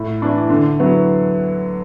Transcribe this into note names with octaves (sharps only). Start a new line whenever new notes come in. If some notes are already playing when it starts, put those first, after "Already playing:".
Already playing: A2
E3 D4
D3
F#3 B3 E4